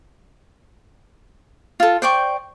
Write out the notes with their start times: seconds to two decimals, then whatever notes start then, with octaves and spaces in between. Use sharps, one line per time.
1.80 F4 A4
2.02 C5 D5 G5 C#6